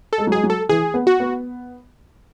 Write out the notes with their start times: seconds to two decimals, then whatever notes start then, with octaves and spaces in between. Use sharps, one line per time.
0.13 A4
0.18 G#3
0.27 F#3
0.32 G#3 G#4
0.43 F#3
0.50 A4
0.69 E3 G#4
0.94 B3
1.07 F#4
1.20 B3